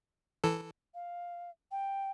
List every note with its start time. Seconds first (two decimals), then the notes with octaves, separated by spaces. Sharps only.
0.44 E3 A4
0.94 F5
1.71 G5